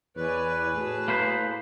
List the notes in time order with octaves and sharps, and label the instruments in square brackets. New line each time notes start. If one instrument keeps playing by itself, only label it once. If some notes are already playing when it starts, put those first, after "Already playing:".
[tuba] E2 [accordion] B4 [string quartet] C#5 D5 G#5
[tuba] A2 [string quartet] F#4 G#4 A5
[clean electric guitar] A#3 B4 C5